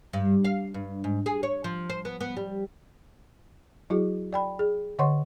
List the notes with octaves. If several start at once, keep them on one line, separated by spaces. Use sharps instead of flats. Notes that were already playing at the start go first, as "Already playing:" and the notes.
G2
F5
G2
G#2
G#4
C#5
F3
C5
B3
B3
G3
F#3 E4 F#4 G#4
D5 G5 B5
G#4
D3 C#5 D#5 F#5 C6 C#6